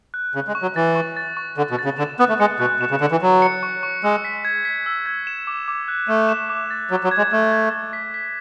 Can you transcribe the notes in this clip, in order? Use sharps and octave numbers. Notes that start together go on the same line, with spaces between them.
F#6
C#3 F#6
G#3
C#6
F#3
E3 A6
C#6
A6
C#6
D3 C#6
B2
A6
C#3
D3 E7
B3 F#6
A3
G#3 C#7
B2 F#6
B2 E7
C#3
D3 C#7
E3
F#3 E7
C#7
C#6
C#6
G#3 E6
B6
G#6
B6
E6
G#6
E7
D6
D6
F#6
A3 E7
E7
D6
A6
F#3 B6
F#3
G#6
G#3
A3 G#6
G#6
G#6
B6
B6